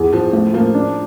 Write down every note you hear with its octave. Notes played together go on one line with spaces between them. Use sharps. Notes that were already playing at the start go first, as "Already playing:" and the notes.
Already playing: E2
E2 F3
A2 F3
F3 A#3
D4